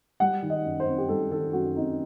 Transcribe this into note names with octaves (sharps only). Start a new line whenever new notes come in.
G3 F#5
D#3
D#5
F#2
C5
C4
G4
G3 A4
D#3 A4
F#2 F#4
C4 D#4